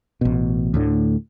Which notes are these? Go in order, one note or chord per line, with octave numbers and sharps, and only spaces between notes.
A1 B2
D2 A2 D3